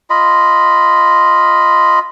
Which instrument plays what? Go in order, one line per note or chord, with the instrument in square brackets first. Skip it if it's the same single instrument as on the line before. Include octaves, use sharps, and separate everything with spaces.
[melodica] F4 D#5 B5